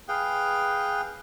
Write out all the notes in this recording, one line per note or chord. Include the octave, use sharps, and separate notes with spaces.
G#4 B4 F5 G5